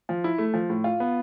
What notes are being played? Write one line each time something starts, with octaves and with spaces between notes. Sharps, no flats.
F3
E4
A3
F3
A2
F4
B3